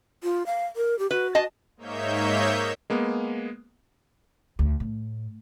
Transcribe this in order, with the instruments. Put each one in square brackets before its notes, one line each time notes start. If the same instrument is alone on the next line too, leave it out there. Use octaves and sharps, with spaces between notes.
[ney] F4
F5
A#4
G4
[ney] F#4 [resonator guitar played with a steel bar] B4
[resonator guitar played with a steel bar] D#5 A5
[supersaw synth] G#2 A#3 D#4 C#5 E5 G6
[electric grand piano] G#3 A#3 B3
[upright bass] D2
A2